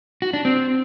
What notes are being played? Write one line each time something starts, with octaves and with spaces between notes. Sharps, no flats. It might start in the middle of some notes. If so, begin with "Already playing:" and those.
F#4
D4
C4